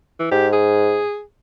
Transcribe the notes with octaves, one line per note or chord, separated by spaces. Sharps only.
E3
G#2 G4
G#4